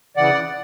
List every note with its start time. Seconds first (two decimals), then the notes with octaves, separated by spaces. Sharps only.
0.17 C#3 E3 D5 F#5